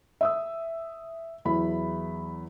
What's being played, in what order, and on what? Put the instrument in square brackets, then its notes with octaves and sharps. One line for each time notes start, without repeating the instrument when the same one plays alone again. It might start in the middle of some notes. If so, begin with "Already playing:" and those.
[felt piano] E5 D#6 E6
E2 F#3 E4 B5